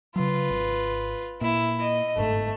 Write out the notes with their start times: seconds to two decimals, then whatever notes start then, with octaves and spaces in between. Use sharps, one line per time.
0.16 C#3 F#3 F4 B4
0.50 G#1
1.41 A#2 E4
1.81 D#5
2.16 G1 G#2 A3